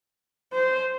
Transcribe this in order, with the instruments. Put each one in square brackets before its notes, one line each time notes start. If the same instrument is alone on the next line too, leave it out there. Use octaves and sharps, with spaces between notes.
[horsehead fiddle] C5